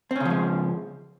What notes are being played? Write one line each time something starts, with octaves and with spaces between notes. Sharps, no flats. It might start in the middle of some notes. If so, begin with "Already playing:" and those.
C#3 F3 G#3 C4 C#4